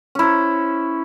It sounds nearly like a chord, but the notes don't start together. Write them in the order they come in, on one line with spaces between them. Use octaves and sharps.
C#4 E4 C5